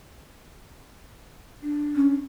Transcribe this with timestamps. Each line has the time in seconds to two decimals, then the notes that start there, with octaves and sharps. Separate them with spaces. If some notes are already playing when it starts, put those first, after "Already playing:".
1.63 D4
1.96 C#4